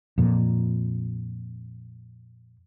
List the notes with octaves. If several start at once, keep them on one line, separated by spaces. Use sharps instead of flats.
F2 A#2